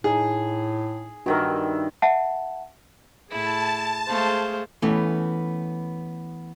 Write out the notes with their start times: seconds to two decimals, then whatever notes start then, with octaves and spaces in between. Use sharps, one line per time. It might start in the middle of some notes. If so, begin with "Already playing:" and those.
0.04 A2 D#4 G#4
1.26 G2 D#3 F#4 A#4 E5
2.02 E5 F#5 A5
3.29 A2 E4 G#4 A5
4.08 G#3 A3 G#4 C5 F5
4.82 E3 A3 B3 C#4